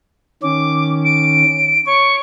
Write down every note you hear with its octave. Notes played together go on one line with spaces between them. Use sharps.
D#3 C#4 D6
D7
C#5 C#6